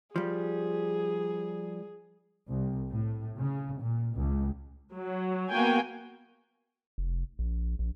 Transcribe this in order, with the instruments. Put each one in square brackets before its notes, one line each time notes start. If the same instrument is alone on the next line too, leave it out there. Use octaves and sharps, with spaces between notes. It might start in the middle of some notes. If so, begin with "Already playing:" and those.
[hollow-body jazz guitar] F3 G3 [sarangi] G#4
[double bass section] C2
A2
C#3
A#2
C#2
[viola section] F#3
A#3 B3 F#4 G5 G#5
[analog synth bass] F1
A#1
A#1